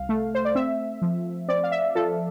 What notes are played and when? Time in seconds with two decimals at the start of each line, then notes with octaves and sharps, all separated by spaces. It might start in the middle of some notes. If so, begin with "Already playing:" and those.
Already playing: C2 F5
0.09 A3
0.35 C5
0.45 D5
0.55 C4 E5
1.02 F3
1.48 C4 D5
1.63 F5
1.72 E5
1.95 F3 A4